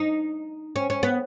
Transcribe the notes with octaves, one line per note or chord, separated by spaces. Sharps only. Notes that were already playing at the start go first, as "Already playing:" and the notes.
Already playing: D#4
C#4
C#4
B3